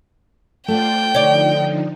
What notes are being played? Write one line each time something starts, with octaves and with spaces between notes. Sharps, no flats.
A3 F4 C5 D5 F#5 G5
D3 F3 D#4 C#5 D5